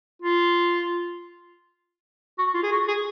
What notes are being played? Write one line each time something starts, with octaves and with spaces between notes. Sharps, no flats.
F4
F#4
F4
G#4
F#4
G#4